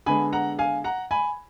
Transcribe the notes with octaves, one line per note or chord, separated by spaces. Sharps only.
D3 G#3 B3 G#5 B5
F#5 A#5
F5 G#5
F#5 A#5
G#5 B5